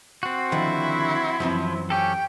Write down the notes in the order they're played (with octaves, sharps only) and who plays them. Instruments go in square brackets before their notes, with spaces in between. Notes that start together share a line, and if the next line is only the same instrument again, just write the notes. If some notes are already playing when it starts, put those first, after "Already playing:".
[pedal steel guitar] C4 F#4
[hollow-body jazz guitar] D3 D#3 F3 [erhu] E4
[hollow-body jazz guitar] F#2 E3 C4 [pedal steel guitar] F3
[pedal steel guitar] C#4 G4 A4 [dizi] G5